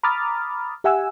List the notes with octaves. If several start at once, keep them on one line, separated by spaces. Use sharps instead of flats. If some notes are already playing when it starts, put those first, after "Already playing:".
A#5 B5 D6 D#6 F6 A6
G4 E5 F#5 G#5 E6